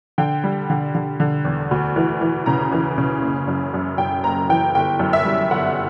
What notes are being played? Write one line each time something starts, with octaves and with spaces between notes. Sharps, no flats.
D3 G5
G3
D3
D3
D3
E2
D2
E3
E3
C#3 A#5
E3
C#3
F#1
F#2
F#2
F#2 G5
F#1 A#5
E3 G5
G1 G5
F#2
E5
G3
G1 F#5